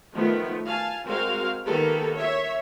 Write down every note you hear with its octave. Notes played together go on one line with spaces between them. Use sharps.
D#3 F3 A3 B3
F5 G#5 A5
G#3 C4 F#4 A#4 F5
D#3 A#3 B3 G4 A4 B4
C#5 E5